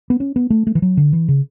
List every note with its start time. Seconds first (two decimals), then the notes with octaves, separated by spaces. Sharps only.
0.10 B3
0.20 C#4
0.36 B3
0.50 A3
0.67 A3
0.75 E3
0.82 F#3
0.97 D3
1.13 E3
1.28 C#3